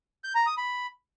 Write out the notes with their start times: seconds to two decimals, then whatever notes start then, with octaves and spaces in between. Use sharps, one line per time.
0.24 G6
0.35 A#5
0.46 D#6
0.57 B5